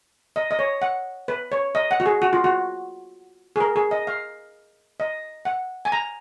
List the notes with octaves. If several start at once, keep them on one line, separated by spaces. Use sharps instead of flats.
D#5
D#5
C#5
F#5
B4
C#5
D#5
F#5
F#4
G#4
F#4
F4
F#4
G#4
A#4
G#4
D#5
F5
D#5
F#5
G#5
A#5